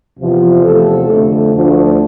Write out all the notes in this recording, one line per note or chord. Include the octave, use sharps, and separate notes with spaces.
E2 C3 F3
E2 C3 F3 A3 A4
F2 D3 A3
D2 D3 F3 A3